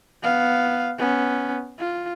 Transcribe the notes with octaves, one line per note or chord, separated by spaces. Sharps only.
B3 F5
B3 C#4
F4